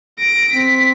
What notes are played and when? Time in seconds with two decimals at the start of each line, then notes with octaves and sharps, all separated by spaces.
0.19 A#6 D7
0.52 C4 B6